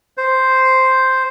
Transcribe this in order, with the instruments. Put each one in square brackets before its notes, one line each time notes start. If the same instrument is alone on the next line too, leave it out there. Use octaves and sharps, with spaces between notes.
[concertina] C5